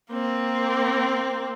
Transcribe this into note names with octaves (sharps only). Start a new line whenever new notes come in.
A#3 C4